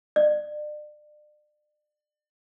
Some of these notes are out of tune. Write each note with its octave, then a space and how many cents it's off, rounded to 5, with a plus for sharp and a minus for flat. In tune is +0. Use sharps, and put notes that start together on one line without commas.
D5 +35